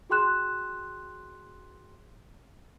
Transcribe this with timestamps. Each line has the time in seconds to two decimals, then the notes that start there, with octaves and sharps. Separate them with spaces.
0.10 F#4 G#4 G5 C6 F#6 E7